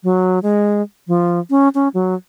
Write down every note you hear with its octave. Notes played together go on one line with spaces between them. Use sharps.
F#3
G#3
F3
C#4
C#4
F#3